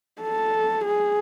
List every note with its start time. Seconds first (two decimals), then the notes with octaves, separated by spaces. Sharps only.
0.22 A4
0.85 G#4